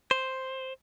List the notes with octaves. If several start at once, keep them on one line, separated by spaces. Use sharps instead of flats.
C5